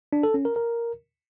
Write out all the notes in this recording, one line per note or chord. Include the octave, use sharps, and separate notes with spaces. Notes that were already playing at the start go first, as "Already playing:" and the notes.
D4
A4
C#4
A#4
A#4